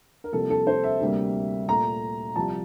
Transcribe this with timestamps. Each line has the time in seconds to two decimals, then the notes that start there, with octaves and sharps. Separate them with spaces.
0.24 A#4
0.32 C2 C3 F3 A#3 A4
0.50 A4
0.67 C5
0.84 E5
1.00 D2 C3 G3 A#3
1.68 A#2 A3 A#5
2.36 C2 C3 F3 A5